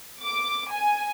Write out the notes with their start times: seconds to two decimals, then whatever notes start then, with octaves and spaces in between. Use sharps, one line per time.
0.22 D6
0.71 G#5